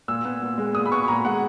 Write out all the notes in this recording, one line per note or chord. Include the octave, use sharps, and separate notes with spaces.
A#2 E6
B3
A#2
G#3
A#2 D#6
B5
B3 C#6
A#2 A#5
G#3 F#5